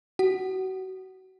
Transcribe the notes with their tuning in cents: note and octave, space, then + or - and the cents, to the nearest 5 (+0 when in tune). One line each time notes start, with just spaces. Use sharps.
F#4 +30 F#5 +25